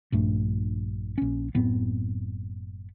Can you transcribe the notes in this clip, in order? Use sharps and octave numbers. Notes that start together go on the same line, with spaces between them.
A#1 G2 A3
A#1 C#4
F#1 A2 B3 C4